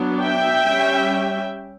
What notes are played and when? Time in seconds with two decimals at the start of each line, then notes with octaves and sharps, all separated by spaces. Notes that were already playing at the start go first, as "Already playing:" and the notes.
Already playing: F#3 B3 D4
0.22 E5 G5
0.67 G3 C#4